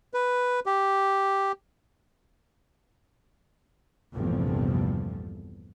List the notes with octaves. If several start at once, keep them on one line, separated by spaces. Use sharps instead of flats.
B4
G4
A#1 E2 G2 C3 F3 A3